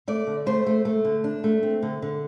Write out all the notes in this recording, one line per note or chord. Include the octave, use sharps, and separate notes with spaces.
A3 D5
D3
A3 C5
A3
A3
D3
D4
A3
C4
D3
D3